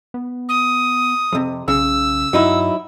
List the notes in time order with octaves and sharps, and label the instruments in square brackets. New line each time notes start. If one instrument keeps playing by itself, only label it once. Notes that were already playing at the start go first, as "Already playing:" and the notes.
[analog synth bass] B3
[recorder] D#6
[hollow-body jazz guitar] F2 C3
[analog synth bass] B1 [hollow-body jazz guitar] C#3 [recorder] E6
[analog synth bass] G2 [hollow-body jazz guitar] F#3 D#4 E4